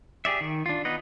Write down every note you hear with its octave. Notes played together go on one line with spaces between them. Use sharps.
G4 G#4 D5 E5
D#3
D4 F4
B3 D#4 B4 D#5